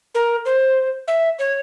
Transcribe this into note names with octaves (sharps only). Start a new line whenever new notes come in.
A#4
C5
E5
C#5